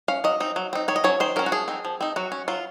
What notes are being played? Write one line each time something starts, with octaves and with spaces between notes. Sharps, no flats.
C#4 F5
F#3 D#5
C4 D#4
F#3
C4 D#4
D#3 C#5
D#5
F#3 C#4 C#5
D#3 C5
F#3 C#4 A#4
F#4
F3 G#4
C4 D#4
F3
C4 D#4
F#3 F#4
C#4
F#3 F4